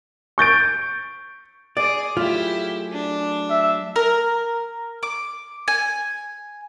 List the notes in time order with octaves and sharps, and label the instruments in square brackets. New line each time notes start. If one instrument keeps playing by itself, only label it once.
[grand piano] C#6 G6 A6 D7
[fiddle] G#4 [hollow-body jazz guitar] D5
[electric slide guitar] F#3 A3 G#4 [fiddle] E4 G4 [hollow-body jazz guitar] F4
[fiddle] D4
[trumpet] E5
[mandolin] A#4
D6
G#5